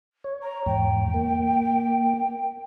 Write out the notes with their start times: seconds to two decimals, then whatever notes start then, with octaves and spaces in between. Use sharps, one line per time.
0.24 C#5
0.42 A#5
0.66 E2 G#2 G5
1.14 A#3